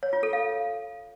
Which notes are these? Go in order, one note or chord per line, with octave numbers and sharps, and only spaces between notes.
C#5
F4
A4
F5